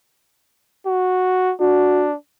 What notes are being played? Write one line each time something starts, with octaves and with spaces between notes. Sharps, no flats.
F#4
D4 F#4